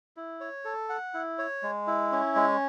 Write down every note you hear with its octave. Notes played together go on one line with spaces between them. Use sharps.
E4
C#5
A4
F#5
E4
C#5
G#3
E4
C#4
G#3